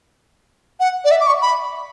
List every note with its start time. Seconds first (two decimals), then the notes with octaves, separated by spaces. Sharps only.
0.80 F#5
1.05 D5
1.11 E5
1.21 D6
1.27 C#6
1.42 B5